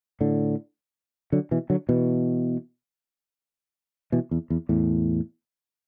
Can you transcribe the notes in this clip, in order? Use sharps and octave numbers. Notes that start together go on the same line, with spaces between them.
A2 D3
D3 F#3
B2 E3
D3 F#3
B2 E3
B2 E3
E2
E2
E2 A2